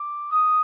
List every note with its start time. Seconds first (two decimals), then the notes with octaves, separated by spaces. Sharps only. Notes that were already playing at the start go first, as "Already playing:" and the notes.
Already playing: D6
0.32 D#6